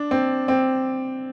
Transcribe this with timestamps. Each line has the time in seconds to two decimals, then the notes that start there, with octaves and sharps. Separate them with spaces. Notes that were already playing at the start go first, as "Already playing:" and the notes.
Already playing: D4
0.11 C4
0.48 C4